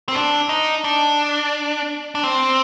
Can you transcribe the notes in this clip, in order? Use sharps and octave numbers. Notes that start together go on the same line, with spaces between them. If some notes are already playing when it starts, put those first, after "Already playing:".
C4
D4
D#4
D4
D4
C4